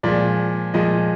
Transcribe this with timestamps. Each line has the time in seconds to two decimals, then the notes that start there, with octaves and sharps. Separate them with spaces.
0.03 A#2 F3 G#3 D5
0.74 A#2 F3 G#3 D#5